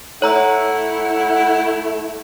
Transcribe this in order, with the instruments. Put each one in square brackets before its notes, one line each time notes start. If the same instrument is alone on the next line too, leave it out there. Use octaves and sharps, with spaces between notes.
[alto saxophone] A3 [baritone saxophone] E4 [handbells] C#5 A#5 E6 [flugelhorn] F#5